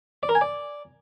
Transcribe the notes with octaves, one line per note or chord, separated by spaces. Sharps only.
D5
A#4
G#5
D5